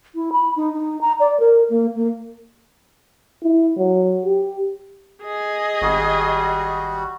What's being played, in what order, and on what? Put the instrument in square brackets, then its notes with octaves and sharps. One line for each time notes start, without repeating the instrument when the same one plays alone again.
[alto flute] E4
B5
D#4
D#4
A#5
D5
A#4
A#3
A#3
[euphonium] E4
F#3
G4
[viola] G#4 D#5
[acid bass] G#1 [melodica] G3 F#4